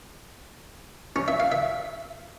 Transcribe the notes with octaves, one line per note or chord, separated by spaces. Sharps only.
C#4
E5
F5
E5